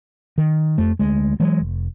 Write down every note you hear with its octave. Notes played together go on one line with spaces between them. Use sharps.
D#3
F2 A3
D2 G#3
E3 F#3 G#3
F1